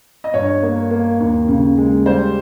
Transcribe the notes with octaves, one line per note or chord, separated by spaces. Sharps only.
D#5
G2 C#5
A#3
A#3
D#2
C#3
G#3
G3 C5